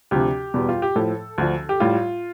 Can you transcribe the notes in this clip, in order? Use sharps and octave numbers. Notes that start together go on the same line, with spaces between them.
D2 C3 F3 G4
E2 B2 G3
F4
G4
A2 F3 A4
D2 D3 F3
G4
A2 G3 F4